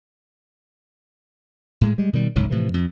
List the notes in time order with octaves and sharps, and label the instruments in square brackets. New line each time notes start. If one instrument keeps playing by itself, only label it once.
[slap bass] A2 G#3
G3 G#3
B2 D#3 G3
F#1 C2 G#2 F#3
A2 C3 E3 F3
F2